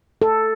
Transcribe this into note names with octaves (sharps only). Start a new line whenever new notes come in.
A4